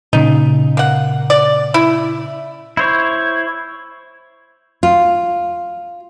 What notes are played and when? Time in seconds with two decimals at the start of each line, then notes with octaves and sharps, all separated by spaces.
0.13 A#2 C#3 D#4
0.77 A#3 F#5
1.30 D5
1.74 E4
2.77 E4 C5 C#5
4.83 F4